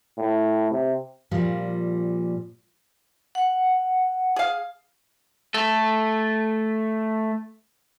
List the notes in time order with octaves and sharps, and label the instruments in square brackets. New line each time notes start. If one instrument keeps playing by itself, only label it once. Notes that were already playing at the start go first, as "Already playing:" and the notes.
[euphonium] A2
C3
[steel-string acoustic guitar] A#2 F3 G3
[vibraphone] F#5
[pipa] G#4 F5
[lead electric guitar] A3 A4